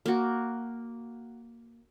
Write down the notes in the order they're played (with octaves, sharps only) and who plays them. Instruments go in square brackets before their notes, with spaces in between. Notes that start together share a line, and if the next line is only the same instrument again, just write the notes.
[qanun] A#3 F#4